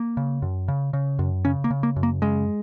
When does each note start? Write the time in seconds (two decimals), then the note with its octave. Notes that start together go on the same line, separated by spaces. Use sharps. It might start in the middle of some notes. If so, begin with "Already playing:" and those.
Already playing: A#3
0.17 C#3
0.42 F#2
0.68 C#3
0.93 C#3
1.19 F#2
1.45 C#3 C#4
1.64 A#3
1.71 C#3
1.83 A#3
1.96 F#2
2.03 A#3
2.22 C#3 G#3